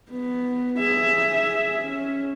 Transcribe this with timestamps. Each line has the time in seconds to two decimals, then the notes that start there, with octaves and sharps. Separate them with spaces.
0.11 B3
0.79 G#4 E5
1.83 C#4